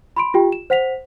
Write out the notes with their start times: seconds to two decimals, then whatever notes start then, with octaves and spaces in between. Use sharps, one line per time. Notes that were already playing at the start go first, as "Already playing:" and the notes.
0.17 B5 C6 D7
0.34 F4 G4 G5
0.52 E7
0.70 C5 F#5 B6 F7